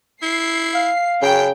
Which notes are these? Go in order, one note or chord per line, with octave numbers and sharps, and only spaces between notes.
E4 C7
F5
F#2 C#3 G5